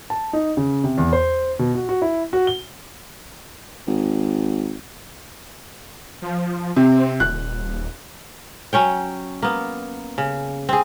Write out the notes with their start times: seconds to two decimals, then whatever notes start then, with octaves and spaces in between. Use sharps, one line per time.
0.10 A5
0.33 D#4
0.57 C#3
0.84 C3
0.98 E2
1.13 C5
1.59 B2
1.75 F#4
1.89 F#4
2.02 E4
2.33 F#4
2.47 G7
3.87 G#1
6.22 F3
6.77 C3 C4
7.20 D#1 F#6
8.73 F#3 C#4 C#5 G5
9.43 A#3 B3
10.18 C#3
10.69 C4 G#4